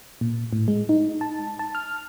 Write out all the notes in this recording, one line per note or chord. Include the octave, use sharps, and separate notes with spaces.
A#2
A2
G#3
D#4
A5
A5
F6